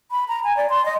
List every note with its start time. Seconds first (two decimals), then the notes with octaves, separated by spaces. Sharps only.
0.11 B5
0.28 A#5
0.44 G#5
0.57 D5
0.70 C6
0.85 D#5